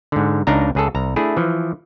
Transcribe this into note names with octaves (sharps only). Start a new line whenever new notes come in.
G#2 D3
C#2 D4 D#4 F5 A#5
C#2 G#4 A4
C2 A#5
A3 D4 E4 G#4
E3 F3